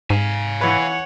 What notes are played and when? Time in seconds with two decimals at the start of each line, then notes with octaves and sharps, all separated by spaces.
0.10 G#2 F5 G#5
0.61 E3 B4 C#5 F#5